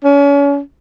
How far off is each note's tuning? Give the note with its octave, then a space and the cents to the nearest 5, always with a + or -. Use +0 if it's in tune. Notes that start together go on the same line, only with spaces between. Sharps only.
C#4 +35